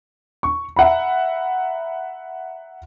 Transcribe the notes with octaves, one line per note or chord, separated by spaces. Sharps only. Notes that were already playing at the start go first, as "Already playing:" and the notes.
C#6
E5 F#5 A#5 B5